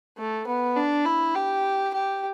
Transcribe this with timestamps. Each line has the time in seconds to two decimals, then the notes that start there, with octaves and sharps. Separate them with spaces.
0.18 A3
0.47 B3
0.76 D4
1.05 E4
1.35 G4
1.94 G4